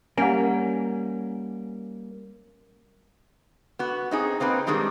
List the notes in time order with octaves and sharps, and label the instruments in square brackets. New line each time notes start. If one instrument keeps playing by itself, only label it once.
[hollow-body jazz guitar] G3 A#4 [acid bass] A#3 [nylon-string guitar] C#4 [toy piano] F#5 G#5
[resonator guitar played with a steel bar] B3 F#4
C4 D#4 G#4
A#3 C4 D#4 B4
D#3 G3 G#3 C4 D4